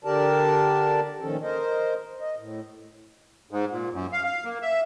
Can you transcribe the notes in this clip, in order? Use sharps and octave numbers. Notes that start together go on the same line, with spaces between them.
D3 D4 G4 A#4 D5 A5
A#2 D#3 F3 C#4 A4
A#4 C5 D#5
D#5
A2
G#2
A#2
F#2
F5
F5
A#3
E5